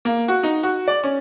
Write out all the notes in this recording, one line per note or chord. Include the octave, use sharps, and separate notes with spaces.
A#3
F#4
D#4
F#4
D5
C#4